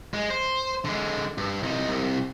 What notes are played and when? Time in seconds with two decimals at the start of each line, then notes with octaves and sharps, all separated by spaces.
0.14 G#3
0.30 C5
0.85 D3 G#3
1.38 G2
1.63 C2 D#4
1.88 C2